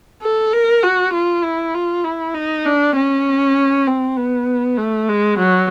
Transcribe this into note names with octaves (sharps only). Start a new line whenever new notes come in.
A4
A#4
F#4
F4
E4
F4
E4
D#4
D4
C#4
C4
B3
A3
G#3
F#3